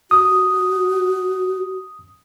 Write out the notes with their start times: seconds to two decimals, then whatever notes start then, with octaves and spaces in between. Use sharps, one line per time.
0.11 F#4 D#6